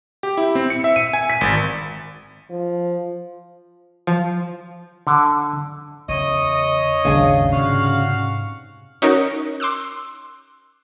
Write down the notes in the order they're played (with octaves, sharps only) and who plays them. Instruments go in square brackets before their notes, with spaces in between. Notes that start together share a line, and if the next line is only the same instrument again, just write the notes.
[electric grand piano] G4
E4
C4
C#7
E5
D#7
G#5
B6
G#1
[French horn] F3
[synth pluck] F3
[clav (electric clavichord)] D3
[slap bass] E2 C#3 [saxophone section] C#5 D#5
[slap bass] G#1 D#2 A2 [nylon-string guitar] C#3 D4
[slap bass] G#2 C3 [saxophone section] F#4 F5
[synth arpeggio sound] C#4 D#4 F#4 A#4 C#5
C6 D6 E6 F#6